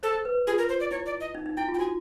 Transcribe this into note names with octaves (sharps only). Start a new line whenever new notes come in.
A4 C5
B4
F4 G#4
A#4
C5
D5
E4 C#5
D5
D#5
D#4
D#4
E4 G5
F4
G5
F#4 G#5